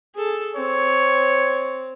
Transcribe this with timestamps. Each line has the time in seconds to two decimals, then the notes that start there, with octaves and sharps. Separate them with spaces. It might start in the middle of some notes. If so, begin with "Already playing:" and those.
0.15 G#4 A4
0.56 C4 C#5